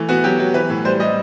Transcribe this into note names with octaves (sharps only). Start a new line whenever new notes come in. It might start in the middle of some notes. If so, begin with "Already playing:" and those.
Already playing: E3 A3
B3 F#4
F#3 G4
F#3
E3 B4
A2
G3 C5
G3 D#5